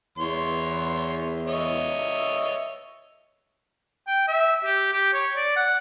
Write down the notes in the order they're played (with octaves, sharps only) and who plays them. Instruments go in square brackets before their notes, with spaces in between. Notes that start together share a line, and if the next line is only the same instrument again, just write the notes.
[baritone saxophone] E2 [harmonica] C#5 C6
[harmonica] C#5 D#5 E5
[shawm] G5
E5
G4
G4
C#5
D5
F#5